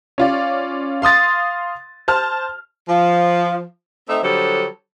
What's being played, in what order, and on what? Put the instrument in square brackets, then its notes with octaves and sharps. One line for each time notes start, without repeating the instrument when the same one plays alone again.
[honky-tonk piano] C#4 F4 D5
F5 C6 D#6 A6
C5 A5 F6
[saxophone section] F3
A3 C4 D#4 E5
D3 F#3 G3 A4 C5